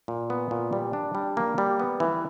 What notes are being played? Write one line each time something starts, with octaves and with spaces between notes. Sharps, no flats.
A#2
B3
A#2
G3
D4
G3
A#3
G3
B3
E3